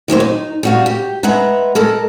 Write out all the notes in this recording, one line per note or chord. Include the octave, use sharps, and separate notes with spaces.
D#3 F#3 A#3 C5
D#4
G3 F#4 F5
G4
G#3 B4 E5 F#5 A#5
G#3 A4 A#4